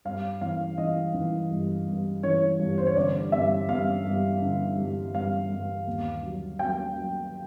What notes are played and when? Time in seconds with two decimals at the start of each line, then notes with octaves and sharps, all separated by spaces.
0.05 G2 F5
0.41 E3 F5
0.78 E3 D#5
1.14 E3
1.51 G2
1.87 G2
2.23 E3 C#5
2.59 G2
2.78 C5
2.86 C#5
2.96 D3 D5
3.32 G2 E5
3.69 G2 F5
4.05 G2
4.41 D3
4.78 G2
5.14 G2 F5
5.50 G2
5.87 D#2
6.23 F#3
6.59 F#3 G5
6.96 F#3